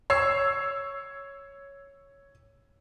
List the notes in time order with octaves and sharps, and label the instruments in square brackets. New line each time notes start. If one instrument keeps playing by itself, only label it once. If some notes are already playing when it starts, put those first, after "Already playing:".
[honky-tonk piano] C#5 E6 C7